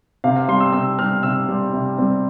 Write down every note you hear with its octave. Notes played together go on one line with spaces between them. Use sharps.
C3 F5
F5
G3 C4 C6
E6
C3 E6
G3 C4 F6
C3 E6
G3 C4
C3
G3 C4